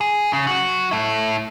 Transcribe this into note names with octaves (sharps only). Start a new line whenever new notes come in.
G#4
C#3
F#3 F#4
E4 A4